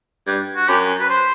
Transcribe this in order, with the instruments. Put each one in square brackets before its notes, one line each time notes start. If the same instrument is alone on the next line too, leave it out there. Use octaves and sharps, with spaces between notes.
[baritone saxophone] G2
[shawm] F#4
[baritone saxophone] F#2 [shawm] G4
[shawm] B4
C5